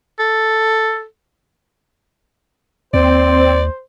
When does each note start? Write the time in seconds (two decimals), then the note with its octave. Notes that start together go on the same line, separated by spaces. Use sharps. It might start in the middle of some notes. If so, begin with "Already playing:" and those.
0.19 A4
2.94 D#2 C4 C5 D5